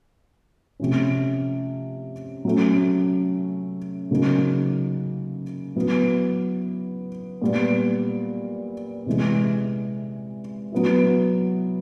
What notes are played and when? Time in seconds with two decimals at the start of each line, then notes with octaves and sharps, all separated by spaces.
0.80 C3 F3 A3 C#4
2.45 F#3 A3 C#4
4.11 C#3 F#3 A#3 D#4
5.76 F#3 B3 E4
7.42 A#2 G3 B3
9.06 C3 E3 G#3
10.72 F#3 B3 E4